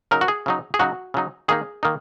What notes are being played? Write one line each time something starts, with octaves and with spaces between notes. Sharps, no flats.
C#3 F#3 D#4 A#4
F#4
G#4
C#3 F#3 D#4
G#4
C#3 F#3 D#4 F#4
C#3 F#3 D#4
D#3 A#3 D#4 G#4
D#3 A#3 D#4